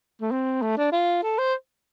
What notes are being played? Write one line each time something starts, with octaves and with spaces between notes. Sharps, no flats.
A3
C4
A3
D4
F4
A4
C5